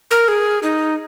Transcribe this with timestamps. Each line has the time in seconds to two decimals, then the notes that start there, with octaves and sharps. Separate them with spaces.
0.11 A#4
0.28 G#4
0.63 D#4